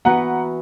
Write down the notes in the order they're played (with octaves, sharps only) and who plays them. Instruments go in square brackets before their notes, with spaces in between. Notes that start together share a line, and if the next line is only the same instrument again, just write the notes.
[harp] E3 B3 F#4 B4 [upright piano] F#5 A#5